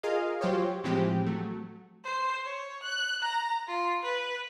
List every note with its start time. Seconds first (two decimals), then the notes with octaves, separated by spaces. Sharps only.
0.03 F4 G#4 A#4 D#5 F5
0.41 F#3 F4 G4 C5 C#5
0.84 A2 E3 F3 G#3 C4 G4
1.26 F#3 A3
2.04 C5
2.45 C#5
2.83 F#6
3.22 A#5
3.67 F4
4.02 B4